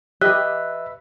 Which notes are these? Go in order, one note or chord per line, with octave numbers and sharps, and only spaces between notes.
G4 B4 D#5 E5 F#6